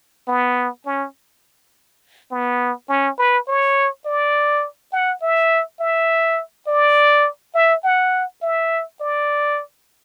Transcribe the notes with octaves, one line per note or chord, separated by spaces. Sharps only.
B3
C#4
B3
C#4
B4
C#5
D5
F#5
E5
E5
D5
E5
F#5
E5
D5